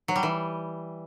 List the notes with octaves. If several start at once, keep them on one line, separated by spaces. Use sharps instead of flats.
F#3
G3
E3